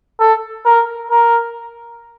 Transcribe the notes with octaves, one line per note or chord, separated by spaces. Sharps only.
A4
A#4
A#4